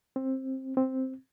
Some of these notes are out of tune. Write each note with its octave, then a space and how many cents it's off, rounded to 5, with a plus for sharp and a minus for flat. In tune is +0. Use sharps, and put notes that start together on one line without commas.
C4 +15
C4 +0